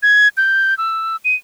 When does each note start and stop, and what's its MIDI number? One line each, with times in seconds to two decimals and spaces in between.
0.03 0.28 92
0.37 0.77 91
0.78 1.16 88
1.25 1.35 99